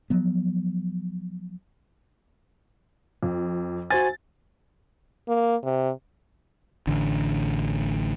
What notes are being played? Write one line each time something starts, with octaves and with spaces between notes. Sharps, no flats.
F3 F#3 B3
F2
F#4 C5 G#5 A6
A#3
C3
A1 D3